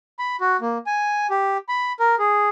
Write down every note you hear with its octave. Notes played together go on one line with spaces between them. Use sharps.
B5
F#4
A#3
G#5
G4
B5
A#4
G#4